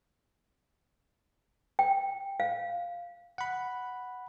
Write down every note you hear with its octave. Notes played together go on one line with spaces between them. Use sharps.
G5
F5
F#5 B5